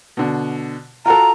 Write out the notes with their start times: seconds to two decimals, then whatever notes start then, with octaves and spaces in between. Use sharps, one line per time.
0.17 B2 D3
1.06 F4 F#4 A4 A#5